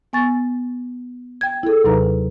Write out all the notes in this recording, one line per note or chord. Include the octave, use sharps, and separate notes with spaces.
B3 G#5 C#6 A6
G5 G#6
E4 G#4 A4
D#2 C3 F#3 D#4 B4 A#5